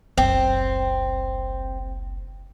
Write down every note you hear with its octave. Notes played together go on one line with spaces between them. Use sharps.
F#1 C2 C4